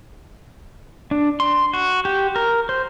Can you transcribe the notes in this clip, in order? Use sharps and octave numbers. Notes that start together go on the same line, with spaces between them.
D4
C6
F#4
G4
A#4
C5